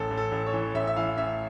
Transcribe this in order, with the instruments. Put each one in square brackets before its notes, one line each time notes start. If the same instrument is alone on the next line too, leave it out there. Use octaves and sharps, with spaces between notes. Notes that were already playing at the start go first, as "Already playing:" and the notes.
Already playing: [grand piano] A1 A4
A1
A4
A1
C#5
E3
A1 E5
E5
E3 F5
A1 E5